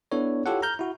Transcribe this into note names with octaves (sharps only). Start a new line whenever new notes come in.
B3 D4 E4 A4 C#5
E4 F4 G4 A4 C#5 F#5
A#5 F6 G6
E4 F#4